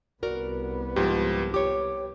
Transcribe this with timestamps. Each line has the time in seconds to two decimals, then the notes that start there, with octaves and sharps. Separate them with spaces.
0.23 C2 B3 F#4 A#4 D5
0.96 G#2 F3 G4
1.54 G4 C#5 D6